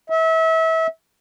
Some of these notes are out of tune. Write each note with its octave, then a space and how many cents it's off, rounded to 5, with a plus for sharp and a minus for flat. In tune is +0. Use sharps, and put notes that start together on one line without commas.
E5 -30